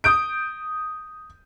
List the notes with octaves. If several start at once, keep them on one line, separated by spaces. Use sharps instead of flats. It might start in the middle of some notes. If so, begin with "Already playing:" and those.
D#6 G6 D7